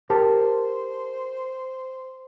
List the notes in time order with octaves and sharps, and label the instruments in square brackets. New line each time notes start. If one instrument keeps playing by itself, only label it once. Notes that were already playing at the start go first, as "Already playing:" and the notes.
[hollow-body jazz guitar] G4 A#4 A5 [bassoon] C5